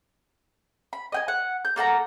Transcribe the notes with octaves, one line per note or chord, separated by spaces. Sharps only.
B5
D#5 G5 G#5
F#5
G6
A#3 A4 F#5 A#5